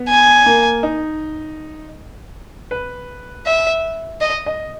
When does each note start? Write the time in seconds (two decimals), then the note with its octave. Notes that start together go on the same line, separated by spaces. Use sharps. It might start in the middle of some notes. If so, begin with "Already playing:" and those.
Already playing: B3
0.09 G#5
0.46 A#3
0.83 D#4
2.71 B4
3.46 E5
4.21 D#5
4.46 D#5